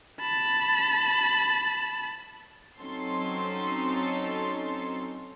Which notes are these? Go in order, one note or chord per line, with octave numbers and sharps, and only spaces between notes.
A5 B5
F#3 C4 C#4 D#4 A4 C6